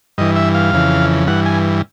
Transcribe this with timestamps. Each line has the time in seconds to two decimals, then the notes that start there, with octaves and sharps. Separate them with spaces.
0.18 G2 E3 D#5
0.36 E5
0.55 F5
0.73 F2 C#3 E3
1.27 G2 E3 F#5
1.46 G#5